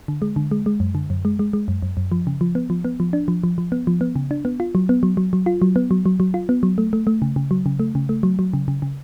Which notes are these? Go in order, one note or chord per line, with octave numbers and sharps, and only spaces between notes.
D3
G#3
D3
G#3
G#3
F#2
D3
F#2
G#3
G#3
G#3
F#2
F#2
F#2
F3
C#3
F3
B3
F3
B3
F3
D4
F3
F3
F3
B3
F3
B3
C#3
D4
B3
F4
F#3
B3
F#3
F#3
F#3
F4
F#3
B3
F#3
F#3
F#3
F4
B3
F#3
A3
A3
A3
C#3
C#3
F#3
C#3
A3
C#3
A3
F#3
F#3
C#3
C#3
C#3